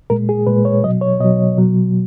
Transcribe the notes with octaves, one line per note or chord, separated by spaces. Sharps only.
A#2 G#3 A#4
G#4
A#2 G#3 B4
C#5
B2 F#3 D#5
C#5
B2 F#3 D#5
B2 F#3